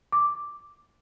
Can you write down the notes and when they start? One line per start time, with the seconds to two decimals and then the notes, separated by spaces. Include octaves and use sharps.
0.12 D6